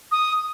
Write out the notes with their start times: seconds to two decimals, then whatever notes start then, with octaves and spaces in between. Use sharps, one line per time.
0.12 D#6